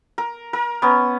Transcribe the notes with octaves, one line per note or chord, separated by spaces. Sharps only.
A#4
A#4
B3 C#4